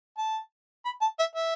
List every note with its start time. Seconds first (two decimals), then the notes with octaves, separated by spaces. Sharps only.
0.18 A5
0.85 B5
1.02 A5
1.19 E5
1.36 E5